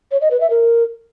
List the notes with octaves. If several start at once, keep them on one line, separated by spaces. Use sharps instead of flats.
C#5
D#5
B4
E5
A#4